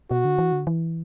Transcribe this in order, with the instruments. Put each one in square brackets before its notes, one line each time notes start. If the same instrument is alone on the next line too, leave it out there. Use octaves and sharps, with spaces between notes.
[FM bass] B2 [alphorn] F#4
[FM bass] D3
E3
D3
E3